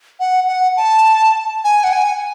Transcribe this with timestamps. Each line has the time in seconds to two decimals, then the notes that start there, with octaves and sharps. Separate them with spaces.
0.20 F#5
0.48 F#5
0.77 A5
1.64 G#5
1.84 F#5
1.93 G#5